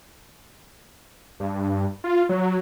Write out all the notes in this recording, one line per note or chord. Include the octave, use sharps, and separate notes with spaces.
G2
F4
F#3